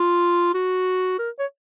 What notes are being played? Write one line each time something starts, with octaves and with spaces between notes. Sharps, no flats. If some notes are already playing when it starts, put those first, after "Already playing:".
Already playing: F4
F#4
A#4
C#5